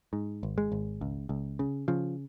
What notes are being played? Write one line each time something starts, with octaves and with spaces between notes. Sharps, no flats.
G#2
G#1
G#3
G#1
C#2
C#2
C#3
C#3 F3